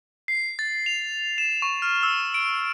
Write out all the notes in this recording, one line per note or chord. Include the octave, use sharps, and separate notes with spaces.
C7
A6
F7
E7
C#6
F6
E6
D7